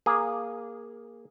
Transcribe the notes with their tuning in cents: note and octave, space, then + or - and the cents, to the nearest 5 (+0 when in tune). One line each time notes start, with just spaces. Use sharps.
A#3 +0 G#4 -15